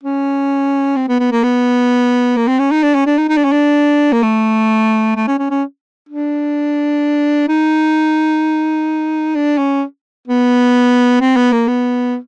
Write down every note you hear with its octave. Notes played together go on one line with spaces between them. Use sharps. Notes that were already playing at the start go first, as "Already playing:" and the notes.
C#4
C4
B3
B3
A#3
B3
A#3
C4
C#4
D#4
D4
C#4
D4
D#4
D#4
D4
C#4
D4
A#3
A3
A3
C#4
C#4
C#4
D4
D#4
D4
C#4
B3
C4
B3
A#3
B3